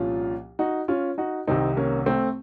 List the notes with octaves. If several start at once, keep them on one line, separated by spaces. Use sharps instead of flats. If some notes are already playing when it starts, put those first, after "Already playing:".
Already playing: C2 A#2 F3 C#4 F4
D#4 F#4
C#4 F4
D#4 F#4
C2 C3 D#3 C4 D#4
A#3 C#4
A3 C4